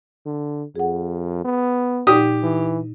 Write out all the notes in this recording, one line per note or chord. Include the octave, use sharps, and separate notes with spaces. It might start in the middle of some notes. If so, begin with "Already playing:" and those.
D3
F2 G#4 F#5
B3
A#2 D#4 G4 D5 D#6
E3